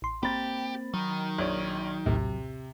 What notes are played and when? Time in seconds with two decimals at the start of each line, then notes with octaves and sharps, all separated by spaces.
0.02 A1 C6
0.23 A#3 C4 G4 B5 A6
0.94 D#3 F#3
1.39 A#1 C#5
2.06 A#1 D#2 A2 C3